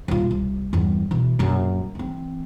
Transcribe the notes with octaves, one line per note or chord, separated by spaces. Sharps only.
D#1 F4
C2
E2 G2
B2 E3
A#1 F#2
E3 C4